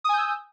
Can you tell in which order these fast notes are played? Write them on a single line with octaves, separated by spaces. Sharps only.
D#6 G#5 G6 E6